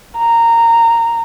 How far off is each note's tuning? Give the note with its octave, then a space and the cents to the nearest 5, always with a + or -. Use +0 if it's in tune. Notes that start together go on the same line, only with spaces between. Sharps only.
A#5 -15